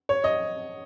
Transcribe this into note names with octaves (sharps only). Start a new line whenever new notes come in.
C#5
D#5